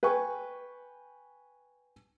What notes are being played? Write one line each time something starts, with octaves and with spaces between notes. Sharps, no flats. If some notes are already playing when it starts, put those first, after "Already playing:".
B4 G5 G#5 C#6